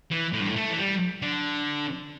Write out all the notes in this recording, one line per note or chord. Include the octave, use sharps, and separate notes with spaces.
E3
A2
G2
A2
A3
E3
G3
D3